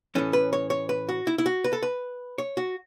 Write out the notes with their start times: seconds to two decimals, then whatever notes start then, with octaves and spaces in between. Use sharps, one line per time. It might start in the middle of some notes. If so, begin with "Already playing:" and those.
0.15 A2 E3 C#4 A4
0.33 B4
0.53 C#5
0.70 C#5
0.89 B4
1.09 F#4
1.27 E4
1.38 E4
1.46 F#4
1.64 B4
1.73 A4
1.83 B4
2.38 C#5
2.57 F#4